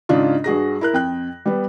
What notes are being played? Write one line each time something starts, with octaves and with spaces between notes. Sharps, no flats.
G#2 C#3 D4 F4
G2 F#4 G#4 A#6
E4 A#4 F#6
F2 G5 F#6
G3 B3